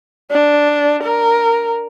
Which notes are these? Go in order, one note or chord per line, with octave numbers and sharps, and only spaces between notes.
D4
A#4